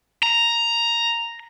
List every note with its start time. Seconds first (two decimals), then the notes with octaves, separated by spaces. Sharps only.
0.23 A#5